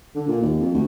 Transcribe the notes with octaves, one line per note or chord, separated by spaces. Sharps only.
D3
A#2
D#2
F2
D2